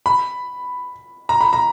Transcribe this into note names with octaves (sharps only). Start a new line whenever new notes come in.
B5
A#5
B5
A#5